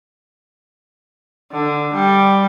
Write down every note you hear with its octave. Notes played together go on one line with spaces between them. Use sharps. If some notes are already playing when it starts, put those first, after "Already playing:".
D3
G3